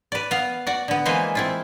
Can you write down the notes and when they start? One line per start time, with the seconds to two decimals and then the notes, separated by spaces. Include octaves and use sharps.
0.12 B4 D5
0.31 B3 F5
0.67 F#4 D5
0.88 D3 B3
1.05 E3 G#3 A#3 B4 C5 G#5
1.35 C4 E4 F4